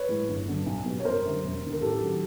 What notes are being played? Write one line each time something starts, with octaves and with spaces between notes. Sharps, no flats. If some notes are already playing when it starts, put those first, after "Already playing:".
Already playing: B4 C#5
A2 E3 G#3
G1
G2 D3 F#3
B1
B2 G3
C#5
F#1 A#4 C5
F#2 D3 G3
E1
D#2 D3
A#4
A1 G4 A4
D#3 F#3